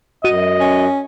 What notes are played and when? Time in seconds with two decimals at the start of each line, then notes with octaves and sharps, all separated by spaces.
0.24 F#2 F#4 D#5 D#7
0.60 C#4